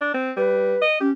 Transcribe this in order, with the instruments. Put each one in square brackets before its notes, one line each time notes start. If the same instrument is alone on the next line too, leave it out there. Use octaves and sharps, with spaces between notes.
[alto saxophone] D4
C4
[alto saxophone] G3 [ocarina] B4
[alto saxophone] D#5
[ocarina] C#4 [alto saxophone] G4